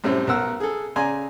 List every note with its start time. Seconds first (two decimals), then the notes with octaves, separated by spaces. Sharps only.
0.04 F#2 A2 C3 G3 C4
0.27 B1 A#4 F#5 E6 F6
0.60 G#4 A4
0.96 C#3 D5 G#5 A#5 C6